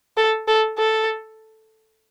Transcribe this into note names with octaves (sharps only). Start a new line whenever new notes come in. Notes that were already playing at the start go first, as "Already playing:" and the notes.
A4
A4
A4